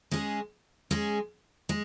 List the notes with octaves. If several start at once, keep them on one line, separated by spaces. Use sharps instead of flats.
G#3 C#4 G#4
G#3 C#4 G#4
G#3